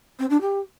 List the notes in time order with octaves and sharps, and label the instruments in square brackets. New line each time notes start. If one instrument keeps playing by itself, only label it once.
[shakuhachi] C4
D4
G4